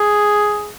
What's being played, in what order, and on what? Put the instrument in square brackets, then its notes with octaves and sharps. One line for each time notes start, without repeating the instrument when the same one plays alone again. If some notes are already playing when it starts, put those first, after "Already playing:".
Already playing: [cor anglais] G#4